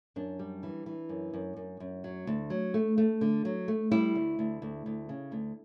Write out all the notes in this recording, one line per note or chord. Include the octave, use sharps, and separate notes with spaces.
F#2 D4
G3
E3
E3
F#2
F#2
F#2
F#2
F#3
D2
F#3
A3
A3
D3
F#3
A3
G3 E4
D2
D2
D2
D2
C#3
D2